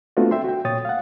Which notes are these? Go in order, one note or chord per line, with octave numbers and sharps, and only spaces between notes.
A3 B3 C4 D4 F4 F#4
E5 G5 C6
F#4 G5
A#2 C#5 G5 D#6 A6
F5 F#5